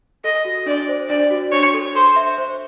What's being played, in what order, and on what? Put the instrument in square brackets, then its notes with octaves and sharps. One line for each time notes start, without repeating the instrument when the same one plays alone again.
[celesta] A4 [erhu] D#5
[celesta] F#4
[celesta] D4 [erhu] D5
[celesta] C5
[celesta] D4 [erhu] D5
[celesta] F#4
[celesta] D4 [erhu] C#5
[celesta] A4
[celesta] A4 [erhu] C5
[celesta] E5
C5